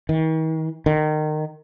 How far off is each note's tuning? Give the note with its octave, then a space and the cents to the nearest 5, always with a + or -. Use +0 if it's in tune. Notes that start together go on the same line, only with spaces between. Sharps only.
D#3 +45
D#3 -25